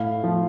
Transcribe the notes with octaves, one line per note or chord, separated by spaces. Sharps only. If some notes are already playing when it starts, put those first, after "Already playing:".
Already playing: A2 F5
F3